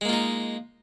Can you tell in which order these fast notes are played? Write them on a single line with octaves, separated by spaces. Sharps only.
G#3 A#3 F4 D#4